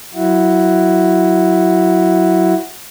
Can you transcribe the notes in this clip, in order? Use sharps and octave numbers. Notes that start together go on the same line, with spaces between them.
F#3 E4 F#4